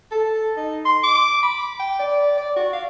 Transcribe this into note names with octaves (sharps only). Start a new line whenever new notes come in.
A4
D#4
C6
D6
B5
G5
D5
D5
F#4
F5